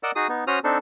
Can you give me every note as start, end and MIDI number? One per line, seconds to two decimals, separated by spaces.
0.03 0.11 70
0.03 0.11 74
0.03 0.11 75
0.03 0.11 78
0.03 0.11 88
0.16 0.27 63
0.16 0.27 66
0.16 0.27 68
0.16 0.27 87
0.29 0.44 59
0.29 0.44 63
0.47 0.59 61
0.47 0.59 66
0.47 0.59 72
0.47 0.59 87
0.47 0.59 89
0.64 0.78 60
0.64 0.78 62
0.64 0.78 63
0.64 0.78 69